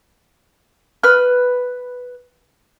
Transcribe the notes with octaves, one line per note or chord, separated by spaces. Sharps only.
B4 F6